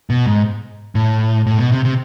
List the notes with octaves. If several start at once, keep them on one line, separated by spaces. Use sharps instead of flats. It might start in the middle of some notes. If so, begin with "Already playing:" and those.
B2
G#2
A2
A2
B2
C3
C3